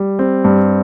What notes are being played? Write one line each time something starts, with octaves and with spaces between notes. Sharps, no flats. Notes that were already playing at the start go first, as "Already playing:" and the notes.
Already playing: G3
C4
G2